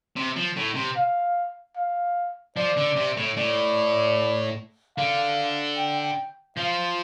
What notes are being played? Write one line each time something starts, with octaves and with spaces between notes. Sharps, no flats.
C3
F3
A2
C3
F5
F5
F3 D5
D3
C3
A2
A2 D5
D3 F5
G5
F3 F5